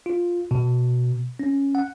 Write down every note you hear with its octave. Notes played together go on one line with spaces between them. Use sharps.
F4
B2
C#4
F#5